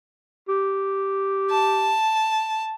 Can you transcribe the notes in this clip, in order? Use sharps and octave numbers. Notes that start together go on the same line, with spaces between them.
G4
A5